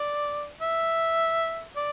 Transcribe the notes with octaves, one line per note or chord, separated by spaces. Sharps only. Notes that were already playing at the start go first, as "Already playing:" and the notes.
Already playing: D5
E5
D5